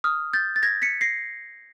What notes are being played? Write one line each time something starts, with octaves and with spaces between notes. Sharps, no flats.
D#6 F6
G6 A6
A6
G#6 A#6
B6 C#7
A#6 C7